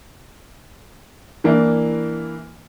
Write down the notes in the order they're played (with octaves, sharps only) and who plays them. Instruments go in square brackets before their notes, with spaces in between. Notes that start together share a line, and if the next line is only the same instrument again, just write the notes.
[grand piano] E3 A#3 D4 E4